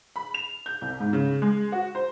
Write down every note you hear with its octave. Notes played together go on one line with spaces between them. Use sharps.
B5
F7
G6
C2
G#2
C#3
G#3
F#4
C5